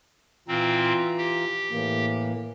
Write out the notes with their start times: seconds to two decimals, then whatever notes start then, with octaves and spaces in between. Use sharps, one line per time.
0.48 A#2 E3 C4 F4 A#5
1.18 G4
1.71 A2 E3 A#3